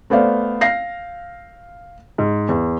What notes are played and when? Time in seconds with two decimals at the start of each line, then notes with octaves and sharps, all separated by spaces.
0.10 A3 B3 C5 D5 F5
0.61 F5 A#6 C7
2.18 G#2
2.49 E2